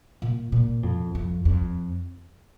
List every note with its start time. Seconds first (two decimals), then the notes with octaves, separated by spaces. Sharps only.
0.22 A#2
0.52 A#2
0.83 F2
1.15 F2
1.45 F2